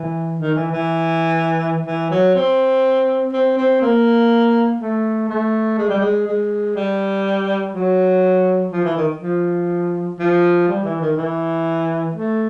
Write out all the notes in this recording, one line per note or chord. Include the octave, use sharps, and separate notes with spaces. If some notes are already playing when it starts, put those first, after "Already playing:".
Already playing: E3
D#3
E3
E3
E3
F#3
C4
C4
C4
A#3
A3
A3
G#3
G3
G#3
G#3
G3
F#3
F3
E3
D#3
F3
F3
G3
E3
D#3
E3
A3